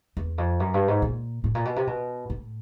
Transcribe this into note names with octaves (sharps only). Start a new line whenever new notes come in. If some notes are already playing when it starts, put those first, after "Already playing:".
E2
F2
F#2
G2
G#2
A#2
A2
A#2
B2
C3
B2
A2